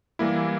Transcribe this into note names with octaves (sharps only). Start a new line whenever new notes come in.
E3 G3 A#3 E4